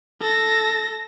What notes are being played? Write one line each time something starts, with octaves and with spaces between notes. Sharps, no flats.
A4 A#6